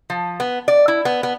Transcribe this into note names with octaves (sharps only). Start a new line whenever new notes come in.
F3
B3
D5
E4
B3
B3